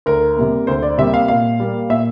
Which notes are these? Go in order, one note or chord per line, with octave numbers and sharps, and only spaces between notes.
D2 A#4
C3 G3 A#3
D2 C5
D5
C3 G3 A#3 E5
F5
A#2 F5
G3 A#3
A#2 E5